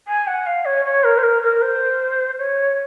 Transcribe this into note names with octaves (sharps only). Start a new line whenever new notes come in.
G#5
F#5
F5
C#5
C#5
A#4
C5
A#4
A#4
C5
C#5